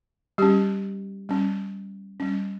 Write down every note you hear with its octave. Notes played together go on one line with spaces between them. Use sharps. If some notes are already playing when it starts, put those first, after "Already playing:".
G3 C#4 G4
G3 C#4
G3 C#4